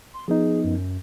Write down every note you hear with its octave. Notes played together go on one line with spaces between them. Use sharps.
C6
F3 B3 D#4 G#4
F#2